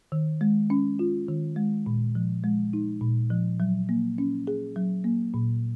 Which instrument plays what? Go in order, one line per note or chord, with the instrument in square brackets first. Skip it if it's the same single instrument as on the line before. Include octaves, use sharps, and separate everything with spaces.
[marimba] D#3
G#3
C#4
F4
D#3
G#3
A#2
F3
G#3
D#4
A#2
F3
F#3
A#3
C#4
G#4
F#3
A#3
A#2